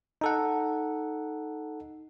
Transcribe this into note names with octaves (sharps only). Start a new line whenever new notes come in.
D#4 A4 F#5